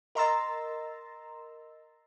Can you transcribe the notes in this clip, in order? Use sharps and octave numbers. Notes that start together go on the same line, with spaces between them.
A#4 D#5 A#5 C6 E6 A6